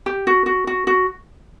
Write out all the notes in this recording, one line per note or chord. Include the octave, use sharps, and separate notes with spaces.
G4
F#4
F#4
F#4
F#4